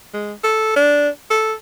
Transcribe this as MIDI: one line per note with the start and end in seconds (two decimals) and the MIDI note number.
0.14 0.33 56
0.44 0.76 69
0.76 1.09 62
1.30 1.53 69